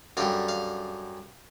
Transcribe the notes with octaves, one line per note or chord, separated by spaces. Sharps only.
F#2 D3 G3 F5
F5